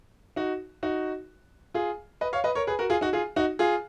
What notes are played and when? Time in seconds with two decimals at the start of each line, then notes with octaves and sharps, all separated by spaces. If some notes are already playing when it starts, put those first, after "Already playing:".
0.36 D#4 F#4
0.83 D#4 F#4
1.74 F4 G#4
2.21 B4 D#5
2.33 C#5 F5
2.44 B4 D#5
2.55 A#4 C#5
2.67 G#4 B4
2.79 F#4 A#4
2.90 F4 G#4
3.01 D#4 F#4
3.13 F4 G#4
3.36 D#4 F#4
3.59 F4 G#4